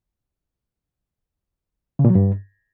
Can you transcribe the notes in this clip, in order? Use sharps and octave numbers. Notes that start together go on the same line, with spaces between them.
C#3
A#2
F#3
G2